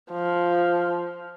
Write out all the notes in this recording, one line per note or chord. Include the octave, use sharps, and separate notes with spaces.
F3